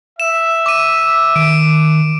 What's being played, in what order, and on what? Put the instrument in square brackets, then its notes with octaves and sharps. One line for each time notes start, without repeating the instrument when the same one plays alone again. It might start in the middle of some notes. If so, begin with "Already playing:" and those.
[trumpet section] E5 [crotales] E7
[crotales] D6 D#7
[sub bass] D#3 [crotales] D7